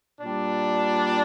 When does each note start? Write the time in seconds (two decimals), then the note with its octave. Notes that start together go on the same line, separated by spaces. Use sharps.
0.21 A#2 G3 D4